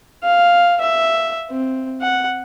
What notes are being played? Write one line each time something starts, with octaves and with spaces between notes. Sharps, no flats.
F5
E5
C4
F#5